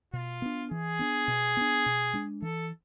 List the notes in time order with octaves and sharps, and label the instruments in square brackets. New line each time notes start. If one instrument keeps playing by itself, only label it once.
[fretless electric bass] B2 [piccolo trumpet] F4
[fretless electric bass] B3 D4
[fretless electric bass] E3 [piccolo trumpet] G#4
[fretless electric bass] B3 D4
B2
B3 D4
B2
G#3 D4
[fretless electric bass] E3 [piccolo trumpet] A4